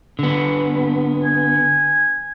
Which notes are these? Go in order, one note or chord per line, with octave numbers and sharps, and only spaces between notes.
D3 B3
G#5